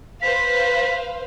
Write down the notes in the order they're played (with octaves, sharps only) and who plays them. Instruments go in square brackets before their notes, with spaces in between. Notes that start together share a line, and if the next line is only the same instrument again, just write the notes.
[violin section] B4 C5 F5 [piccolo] B6